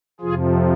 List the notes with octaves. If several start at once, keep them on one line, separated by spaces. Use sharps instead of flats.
F2 C3 F3 F4 G#4